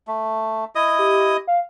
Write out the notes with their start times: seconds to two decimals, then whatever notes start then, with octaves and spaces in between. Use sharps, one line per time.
0.07 A3
0.75 E4 D#5 D#6
0.99 G4
1.47 F5